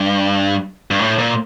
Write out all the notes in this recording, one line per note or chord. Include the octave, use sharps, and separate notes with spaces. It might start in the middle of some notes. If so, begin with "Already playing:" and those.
Already playing: G2
G2
A2
A#2